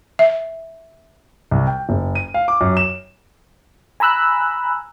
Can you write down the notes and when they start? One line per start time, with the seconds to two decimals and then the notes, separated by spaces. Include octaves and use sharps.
0.19 E5
1.51 C2
1.67 G5
1.89 F#1
2.15 D#7
2.34 F5
2.48 D6
2.61 F#2
2.77 E7
4.00 G#5 A#5 B5 E6 F#6